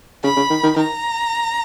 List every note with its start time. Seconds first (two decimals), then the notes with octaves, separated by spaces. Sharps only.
0.24 C#3 B5
0.36 C#3
0.50 D#3
0.63 D#3
0.76 D#3 A#5